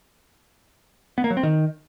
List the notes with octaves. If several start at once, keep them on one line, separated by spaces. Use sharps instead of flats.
B3
A#3
F#3
C4
D#3